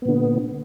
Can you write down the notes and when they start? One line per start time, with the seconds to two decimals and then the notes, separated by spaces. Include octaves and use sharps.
0.02 B3
0.05 A#2
0.09 D3